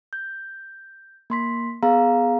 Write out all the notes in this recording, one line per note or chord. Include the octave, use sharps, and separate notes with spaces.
G6
A#3 C6 B6
B3 G#4 F5 A#5